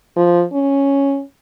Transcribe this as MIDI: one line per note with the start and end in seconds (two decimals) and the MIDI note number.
0.16 0.44 53
0.53 1.22 61